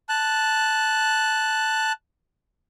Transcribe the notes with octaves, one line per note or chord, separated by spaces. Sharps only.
A5 F#6